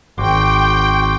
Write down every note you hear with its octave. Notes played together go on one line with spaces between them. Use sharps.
G#1 F#4 G5 C6 D6